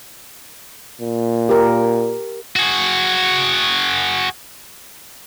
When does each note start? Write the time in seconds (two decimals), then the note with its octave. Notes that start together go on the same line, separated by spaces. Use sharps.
1.01 A#2
1.49 G4 A#4
2.56 F#4 G#4